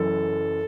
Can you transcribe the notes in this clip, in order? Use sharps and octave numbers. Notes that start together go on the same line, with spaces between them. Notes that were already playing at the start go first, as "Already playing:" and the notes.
Already playing: F#1 F#2 E3 A4